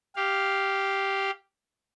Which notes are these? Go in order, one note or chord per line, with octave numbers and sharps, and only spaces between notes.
G4 F5